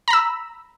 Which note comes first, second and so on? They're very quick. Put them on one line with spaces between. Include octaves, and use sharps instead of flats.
A#5 B5 E6